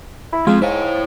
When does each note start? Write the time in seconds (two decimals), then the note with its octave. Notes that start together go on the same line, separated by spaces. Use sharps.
0.33 E4
0.47 F3 G#3 C4 F4 G#4
0.62 G#2 E4 C5 C#5 F5